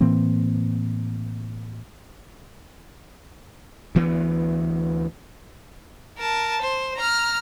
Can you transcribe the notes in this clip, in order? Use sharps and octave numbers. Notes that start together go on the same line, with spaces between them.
A2 E3 A#3 C4
D2 E3 B3
A#4 A5
C5
A#5 F6